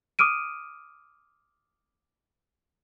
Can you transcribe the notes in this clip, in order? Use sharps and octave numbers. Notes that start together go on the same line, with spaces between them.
D6 D#6 F6 D7 D#7